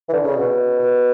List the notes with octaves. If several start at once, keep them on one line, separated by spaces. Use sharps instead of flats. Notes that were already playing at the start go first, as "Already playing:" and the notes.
E3
D3
C#3
B2
B2